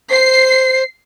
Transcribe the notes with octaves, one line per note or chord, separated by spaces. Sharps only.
C5 C7